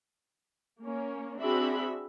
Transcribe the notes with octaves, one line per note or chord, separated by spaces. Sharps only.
A#3 C#4
C4 D4 F#4 G#4 E5 B5